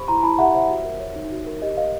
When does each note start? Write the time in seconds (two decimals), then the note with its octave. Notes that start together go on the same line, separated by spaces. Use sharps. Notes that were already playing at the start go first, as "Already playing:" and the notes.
Already playing: G4 C5 B5 C#6
0.08 E4 A#5 C6
0.23 E4 A5 B5
0.38 G4 E5 F#5
0.54 C5 E5
0.70 F#4
0.85 A#4
1.00 C#5
1.16 D#4
1.31 F#4
1.46 A#4
1.62 G4 D#5
1.77 A#4 D#5 F5